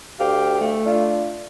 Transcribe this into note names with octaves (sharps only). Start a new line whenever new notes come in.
D2 G4 F5
A3
D4 F4